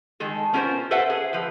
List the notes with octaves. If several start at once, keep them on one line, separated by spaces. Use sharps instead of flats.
D#3 G#3 A4
B3 C#4 F4 G4 A#4 C5
A4 B4 C5 E5 F#5
G#4
F3 B4